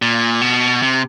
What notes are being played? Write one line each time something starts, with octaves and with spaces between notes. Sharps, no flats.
A#2
B2
C3